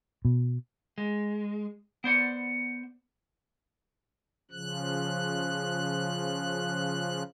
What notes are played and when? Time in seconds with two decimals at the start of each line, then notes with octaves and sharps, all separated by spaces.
0.25 B2
0.98 G#3
2.04 B3 C5 D5 F#5
4.51 C#3 F3 F#6